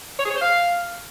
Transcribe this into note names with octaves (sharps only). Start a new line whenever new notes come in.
C#5
G#4
C#5
C5
F5